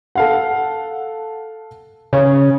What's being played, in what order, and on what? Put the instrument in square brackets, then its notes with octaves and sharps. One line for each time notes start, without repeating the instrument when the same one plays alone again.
[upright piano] A4 F5 F#5
[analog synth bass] C#3 [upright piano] C#5